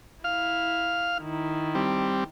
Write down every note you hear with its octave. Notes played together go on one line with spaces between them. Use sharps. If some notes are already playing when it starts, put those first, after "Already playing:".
E4 F5 F6
D#3 E4
G3 C4